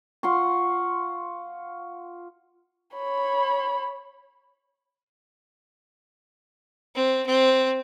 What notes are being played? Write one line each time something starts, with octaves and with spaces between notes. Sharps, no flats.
F4 F#5 C6 C#6
C#5 B5
C4
C4